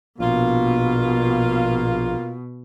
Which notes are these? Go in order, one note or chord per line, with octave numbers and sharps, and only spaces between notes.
A#1 B2 A#3 F4